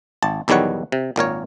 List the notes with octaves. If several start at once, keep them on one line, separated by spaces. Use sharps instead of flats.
G#1 A5
B1 E2 D#3 G3 C#5 F#5
C3
G#1 A#2 A#4 C#5